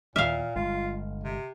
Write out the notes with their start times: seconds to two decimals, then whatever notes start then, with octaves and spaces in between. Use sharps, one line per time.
0.16 D#2 A#2 E3 B3 E5 F5 F6
0.56 G1 G#3 F4
1.24 C3